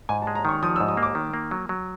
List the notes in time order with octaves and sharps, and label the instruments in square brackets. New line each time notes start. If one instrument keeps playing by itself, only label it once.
[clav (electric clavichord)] G#2 [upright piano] G#5
[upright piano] A5
[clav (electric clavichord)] G#3
[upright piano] A#5
[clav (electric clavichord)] D#3 [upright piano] C#6
[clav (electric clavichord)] F3 [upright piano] D#6
[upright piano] E6
[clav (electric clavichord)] G#2
[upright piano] D#6
[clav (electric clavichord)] A#3
[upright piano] D6
[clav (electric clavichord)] D#3
A#3
F#3
F#3